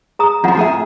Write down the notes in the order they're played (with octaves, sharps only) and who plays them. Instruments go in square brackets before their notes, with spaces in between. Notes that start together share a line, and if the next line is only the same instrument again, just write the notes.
[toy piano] G#4 A#5 D#6
[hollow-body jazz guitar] F2 F3 [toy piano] F4 F#5 A#5
[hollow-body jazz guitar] A2 G#4 E5